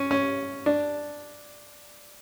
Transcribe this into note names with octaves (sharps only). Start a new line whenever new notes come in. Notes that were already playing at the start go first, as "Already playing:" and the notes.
Already playing: C#4
C#4
D4